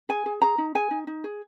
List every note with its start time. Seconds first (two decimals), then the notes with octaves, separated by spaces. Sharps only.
0.09 G#4 G#5
0.26 G#4
0.42 G#4 A#5
0.58 D#4
0.75 G#4 G#5
0.91 D#4
1.07 D#4
1.24 G#4